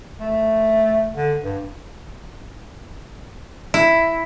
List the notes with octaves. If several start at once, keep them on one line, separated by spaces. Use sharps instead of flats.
A3
D3
G2
E4